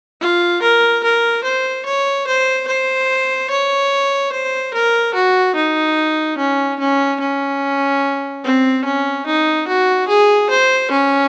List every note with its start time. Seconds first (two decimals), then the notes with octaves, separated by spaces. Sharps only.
0.21 F4
0.62 A#4
1.04 A#4
1.44 C5
1.86 C#5
2.27 C5
2.68 C5
3.50 C#5
4.32 C5
4.74 A#4
5.14 F#4
5.55 D#4
6.38 C#4
6.80 C#4
7.21 C#4
8.44 C4
8.85 C#4
9.26 D#4
9.68 F#4
10.08 G#4
10.50 C5
10.91 C#4